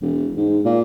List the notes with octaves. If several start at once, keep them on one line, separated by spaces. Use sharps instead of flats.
E1
G#2
A#2